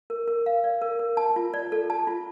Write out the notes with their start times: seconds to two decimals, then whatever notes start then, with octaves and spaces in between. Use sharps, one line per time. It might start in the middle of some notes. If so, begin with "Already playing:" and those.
0.10 A#4
0.28 A#4
0.46 F5
0.64 D5
0.82 A#4
0.99 A#4
1.17 A5
1.36 F4
1.54 D5
1.72 A4
1.90 A5
2.07 F4